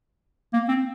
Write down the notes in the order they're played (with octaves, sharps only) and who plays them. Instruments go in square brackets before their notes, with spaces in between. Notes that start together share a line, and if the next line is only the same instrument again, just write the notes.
[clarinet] A#3
C4